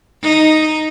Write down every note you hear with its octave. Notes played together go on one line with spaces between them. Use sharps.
D#4